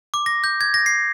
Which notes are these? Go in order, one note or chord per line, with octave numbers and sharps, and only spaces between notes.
D6
A#6
G6
G#6
A#6
C7